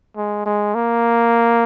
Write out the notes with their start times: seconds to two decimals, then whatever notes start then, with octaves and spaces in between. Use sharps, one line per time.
0.17 G#3
0.46 G#3
0.75 A#3